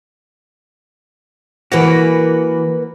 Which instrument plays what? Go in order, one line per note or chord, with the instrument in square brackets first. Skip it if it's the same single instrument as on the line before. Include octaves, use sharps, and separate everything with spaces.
[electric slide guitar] E3 F#4 [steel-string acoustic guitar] A#3 A#4 B4